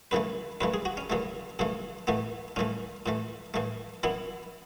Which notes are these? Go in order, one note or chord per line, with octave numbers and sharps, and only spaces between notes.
F#2 C#3 E3 A3 B4
F#2 C#3 E3 A3 B4
G#4
F#4
C#4
F#2 C#3 E3 A3
F#2 C#3 E3 A3
A2 E3 A3 B3
A2 E3 A3 C#4
A2 E3 A3
A2 E3 A3
F#2 E3 B3 E4